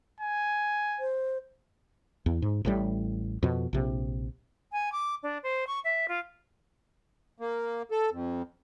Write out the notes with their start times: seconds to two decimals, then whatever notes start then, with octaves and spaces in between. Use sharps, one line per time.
0.21 G#5
0.99 C5
2.26 E2
2.42 G#2
2.65 A1 A2 G3
3.43 F2 B2
3.73 A#1 C3
4.72 G#5
4.92 D6
5.23 D4
5.43 C5
5.67 C#6
5.84 E5
6.08 F4
7.39 A#3
7.91 A4
8.12 F2